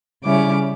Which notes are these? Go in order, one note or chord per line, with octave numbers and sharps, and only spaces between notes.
C#3 G3 C#4 E4 D6